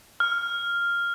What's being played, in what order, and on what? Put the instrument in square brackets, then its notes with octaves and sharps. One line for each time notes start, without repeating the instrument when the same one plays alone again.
[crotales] F6